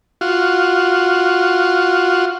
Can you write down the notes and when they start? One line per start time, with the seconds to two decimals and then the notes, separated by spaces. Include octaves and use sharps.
0.21 F4 F#4